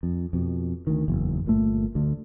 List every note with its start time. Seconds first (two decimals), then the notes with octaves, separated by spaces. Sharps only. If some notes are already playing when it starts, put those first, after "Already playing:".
0.03 F2
0.33 F2 B2
0.87 D2 D#3
1.08 F#1 E2
1.46 G1 A#2 A3
1.95 D2 D3